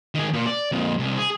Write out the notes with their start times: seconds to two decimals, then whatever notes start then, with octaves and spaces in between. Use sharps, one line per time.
0.15 D#3 G#4
0.33 A#2
0.47 D5
0.72 F2 A#2
0.99 C2
1.18 G#4